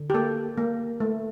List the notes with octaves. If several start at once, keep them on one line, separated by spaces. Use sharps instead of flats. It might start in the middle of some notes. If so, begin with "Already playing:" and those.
Already playing: D3
G4
A#3 A4
A#3
A3